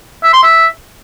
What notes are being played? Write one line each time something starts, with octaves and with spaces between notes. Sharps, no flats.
E5
C6
E5